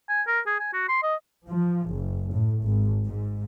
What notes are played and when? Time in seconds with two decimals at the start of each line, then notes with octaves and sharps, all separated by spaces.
0.09 G#5
0.28 A#4
0.47 G#4
0.60 G#5
0.74 F#4
0.89 C6
1.03 D#5
1.48 F3
1.88 F#1
2.32 A2
2.64 G#1
3.06 G#2